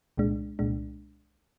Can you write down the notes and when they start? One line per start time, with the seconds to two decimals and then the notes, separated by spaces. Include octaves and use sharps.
0.17 C2 A#2 G#3 D4
0.59 C2 A#2 G#3 D4